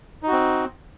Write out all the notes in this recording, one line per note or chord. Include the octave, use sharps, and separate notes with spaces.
C4 D#4 F#4